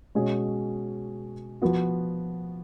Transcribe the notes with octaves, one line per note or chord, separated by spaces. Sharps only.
B2 G#3 C#4 G#4
F3 B3 F#4